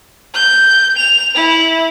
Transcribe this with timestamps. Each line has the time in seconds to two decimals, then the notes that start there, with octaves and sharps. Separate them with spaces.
0.34 G6
0.97 F7
1.35 E4